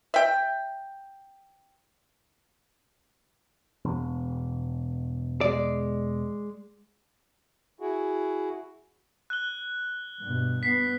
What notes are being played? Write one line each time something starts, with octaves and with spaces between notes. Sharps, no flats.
E5 G5
E1
G#3 D5
E4 F#4 G#4
F#6 G7
G2 B2
B3 B6 C7